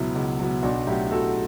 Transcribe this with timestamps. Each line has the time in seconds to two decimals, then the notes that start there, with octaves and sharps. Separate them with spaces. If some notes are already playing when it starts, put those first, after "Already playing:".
Already playing: C#2 B2 F#3 E4
0.15 C#2
0.39 B2 F#3
0.63 B1 D4 F#4
0.86 A2 F#3 E4 G4
1.10 B1 F#4 A4